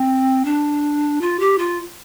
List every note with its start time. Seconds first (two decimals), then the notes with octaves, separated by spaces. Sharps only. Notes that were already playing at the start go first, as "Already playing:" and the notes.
Already playing: C4
0.45 D4
1.21 F4
1.40 G4
1.58 F4